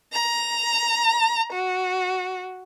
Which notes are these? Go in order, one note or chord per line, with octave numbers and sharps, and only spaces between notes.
A#5
F#4